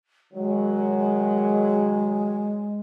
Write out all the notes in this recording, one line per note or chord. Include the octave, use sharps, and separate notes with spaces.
D#3 F#3 G#3